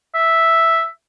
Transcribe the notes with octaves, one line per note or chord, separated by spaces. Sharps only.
E5